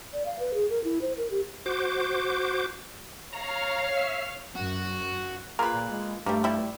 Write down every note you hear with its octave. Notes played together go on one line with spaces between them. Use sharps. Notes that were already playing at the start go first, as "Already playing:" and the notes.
D5
F5
B4
G#4
A#4
E4
C5
A#4
G4
F#4 C5 D6
C#5 F5 A#5
E5
F#2 F#4
A#3 F4 G#4 A#4 B4
A#2
G#3
G2 G3 A3 A#3
G3 A3 E4